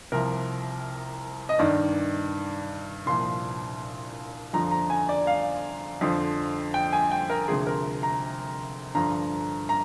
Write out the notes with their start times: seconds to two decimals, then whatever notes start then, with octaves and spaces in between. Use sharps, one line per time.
0.12 C2 C3 F3 A#4
1.49 D#5
1.59 G2 D#3 D5
3.06 C2 A#2 F3 C6
4.53 F2 D3 F3 A#5
4.71 A#5
4.90 G#5
5.09 D5
5.27 F5
6.01 F2 D3 F3
6.74 G5
6.93 G#5
7.11 G5
7.30 A#4
7.47 D2 C3 F3 G#4
7.67 A#4
8.03 A#5
8.95 G2 D3 F3 A#5
9.69 A#5